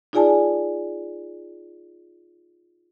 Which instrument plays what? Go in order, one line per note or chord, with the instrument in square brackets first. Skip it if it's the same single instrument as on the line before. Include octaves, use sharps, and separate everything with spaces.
[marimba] D#4 F4 G#4 D5 G#5 A5